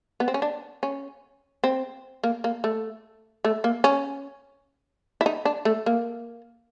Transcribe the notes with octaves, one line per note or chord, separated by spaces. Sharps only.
B3
C4
C#4
D4
C#4
C4
A#3
A#3
A3
A3
A#3
C#4
E4
D#4
D4
A3
A#3